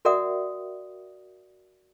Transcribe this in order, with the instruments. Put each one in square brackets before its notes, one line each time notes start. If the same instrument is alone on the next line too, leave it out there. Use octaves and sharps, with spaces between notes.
[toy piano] F#4 A#4 D5 E5 F#5 D#6